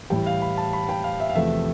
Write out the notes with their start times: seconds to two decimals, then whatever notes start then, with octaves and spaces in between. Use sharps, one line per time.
0.10 A2 E3 G3 G5
0.26 F5
0.42 B5
0.57 A5
0.73 B5
0.89 G5
1.04 F5
1.20 E5
1.29 F5
1.35 E2 C3 F3 A3 E5